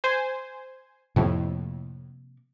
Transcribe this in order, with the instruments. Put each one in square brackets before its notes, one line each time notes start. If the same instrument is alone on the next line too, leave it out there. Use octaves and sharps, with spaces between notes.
[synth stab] C5 G#5
[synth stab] F2 A2 [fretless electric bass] C3 F3 A#3